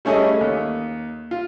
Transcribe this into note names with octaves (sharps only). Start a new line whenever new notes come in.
G3 A3 C#4 G#4 D#5
D#2
F4